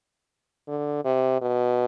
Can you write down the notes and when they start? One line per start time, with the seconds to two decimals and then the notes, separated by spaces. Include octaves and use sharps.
0.68 D3
1.04 C3
1.42 B2